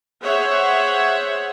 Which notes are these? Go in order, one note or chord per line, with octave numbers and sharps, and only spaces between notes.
G#4 C5 C#5 E5 F#5